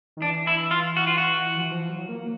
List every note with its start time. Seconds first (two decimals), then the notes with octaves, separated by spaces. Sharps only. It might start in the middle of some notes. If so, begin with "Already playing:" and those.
0.17 D#3
0.21 E3 D4
0.47 E4
0.71 F4
0.97 F#4
1.07 F4
1.18 F#4
1.61 E3
1.71 F3
1.89 F#3
2.09 A#3